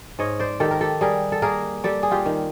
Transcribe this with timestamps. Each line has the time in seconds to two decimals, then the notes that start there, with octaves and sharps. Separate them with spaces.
0.19 G#2 C#5 D#5
0.40 C5 D5
0.60 D#3 G4 A4
0.71 A#4
0.81 G4 A4
1.01 G3 G#4 A#4
1.32 A4
1.42 A#3 G#4 A#4
1.84 G3 G4 A4
2.03 G#4
2.11 F4 G4
2.26 D#3